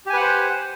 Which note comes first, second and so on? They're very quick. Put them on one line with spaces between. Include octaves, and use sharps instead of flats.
G4 G#5 B4 F#5 C5